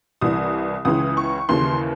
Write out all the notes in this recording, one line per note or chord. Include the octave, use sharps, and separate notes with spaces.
C2 C3 E3 D#6
C#2 C#3 E3 D#6
C#6
D#2 C#3 E3 C6